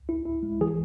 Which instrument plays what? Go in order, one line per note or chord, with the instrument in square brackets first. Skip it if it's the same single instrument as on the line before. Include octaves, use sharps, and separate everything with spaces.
[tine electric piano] E4
E4
G#3
E3 G#4